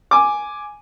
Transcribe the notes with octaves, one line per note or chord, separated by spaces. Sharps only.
G#5 D6